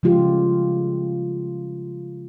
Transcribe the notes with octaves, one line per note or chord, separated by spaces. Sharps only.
C#3 F3 G#3 F4 G4